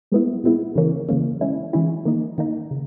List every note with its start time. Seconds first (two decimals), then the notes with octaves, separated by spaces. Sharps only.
0.12 A#2 G#3 B3 E4
0.44 A#2 G#3 B3 E4
0.75 C#3 E3 A#3 C#4
1.09 C#3 E3 A#3 C#4
1.41 E3 G#3 C#4 E4
1.73 E3 G#3 C#4 E4
2.05 D#3 A#3 D#4
2.38 D#3 A#3 D#4
2.71 C#3